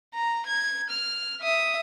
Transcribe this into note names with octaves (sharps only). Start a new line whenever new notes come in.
A#5
G#6
F6
E5 D#6